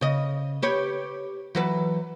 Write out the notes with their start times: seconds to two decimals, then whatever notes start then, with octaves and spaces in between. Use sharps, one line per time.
0.01 C#3 D#5
0.62 G4 B4 C#5
1.55 E3 F#3 B4